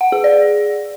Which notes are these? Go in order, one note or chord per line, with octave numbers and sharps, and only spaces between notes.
F#5
G#4
D5